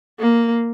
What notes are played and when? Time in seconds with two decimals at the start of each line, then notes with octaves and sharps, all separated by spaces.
0.19 A#3